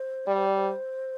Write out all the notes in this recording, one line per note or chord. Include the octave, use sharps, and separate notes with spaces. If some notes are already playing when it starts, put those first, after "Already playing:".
Already playing: C5
G3 D5
C5
D5
C5